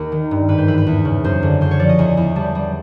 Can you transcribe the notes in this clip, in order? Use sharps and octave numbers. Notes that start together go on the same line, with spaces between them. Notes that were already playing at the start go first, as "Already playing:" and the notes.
Already playing: D#2 A#4
D#3
G2
G#2 B4
C5
E3 B4
B4
E2
C#3
F#2 C5
D3
C#3 C5
C#5
F3 D5
D#5
E2 G#5
E2
G3 A5
G3